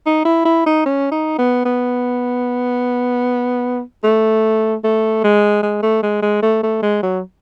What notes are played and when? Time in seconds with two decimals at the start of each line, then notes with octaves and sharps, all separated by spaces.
0.06 D#4
0.25 E4
0.45 E4
0.66 D#4
0.86 C#4
1.11 D#4
1.38 B3
1.65 B3
4.04 A3
4.84 A3
5.24 G#3
5.63 G#3
5.83 A3
6.03 G#3
6.22 G#3
6.43 A3
6.63 A3
6.82 G#3
7.03 F#3